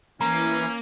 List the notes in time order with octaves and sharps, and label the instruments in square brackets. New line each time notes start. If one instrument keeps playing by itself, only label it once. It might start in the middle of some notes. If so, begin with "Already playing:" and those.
[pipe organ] E3 [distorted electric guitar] A#3 [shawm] C#4 [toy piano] A#5